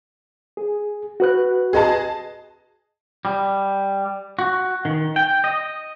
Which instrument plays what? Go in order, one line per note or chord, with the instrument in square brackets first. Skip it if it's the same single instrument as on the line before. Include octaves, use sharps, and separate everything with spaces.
[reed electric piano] G#4
F#4 B4 F#6
[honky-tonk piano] G#4 D#5 A5
[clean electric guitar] G3
F#4
D#3
G5
D#5